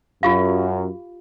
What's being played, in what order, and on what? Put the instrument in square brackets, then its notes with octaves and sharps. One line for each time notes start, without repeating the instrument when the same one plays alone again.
[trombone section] F#2 [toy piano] F4 G4 F5